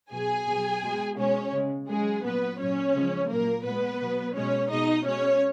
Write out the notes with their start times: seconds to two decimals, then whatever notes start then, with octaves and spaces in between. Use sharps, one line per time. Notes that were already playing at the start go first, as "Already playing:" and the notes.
0.12 B2 F#3 G#4 G#5
0.47 B2 F#3
0.83 B2 G#3
1.18 B2 G#3 C#4 C#5
1.53 C#3 G#3
1.89 C#3 F#3 G#3 G#4
2.24 A#2 F#3 B3 B4
2.59 A#2 F#3 C#4 C#5
2.94 C#3 F3 G#3
3.29 A#2 F#3 A#3 A#4
3.64 A#2 G#3 B3 B4
4.01 B2 F#3
4.35 B2 G#3 C#4 C#5
4.70 B2 G#3 D#4 D#5
5.06 B2 G#3 C#4 C#5